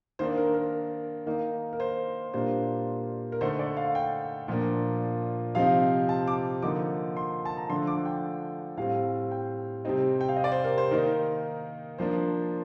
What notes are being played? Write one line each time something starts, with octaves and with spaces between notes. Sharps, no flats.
D#3 A#3 D4 C5
A#4
A#4
D#3 A#3 D#4
A#4
C5
A#2 G3 A#3 D4 C5
A#4
D3 A3 D#4 C5
D5
F5
G5
A#2 F3 A#3 D4
C3 F3 C4 D#4 F5
A5
D6
D3 F3 A#3 D#4 D6
C6
A5
A#5
D3 F3 A3 D4 C6
D6
G5
A2 G3 C4 F5
G5
C3 G3 C4 D#4
G5
F5
D#5
D5
C5
A#4
C5
D#3 A#3 D#4 A#4
F3 A#3 D4 C5